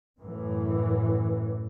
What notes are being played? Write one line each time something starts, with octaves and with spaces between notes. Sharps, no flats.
F#2 A2 E3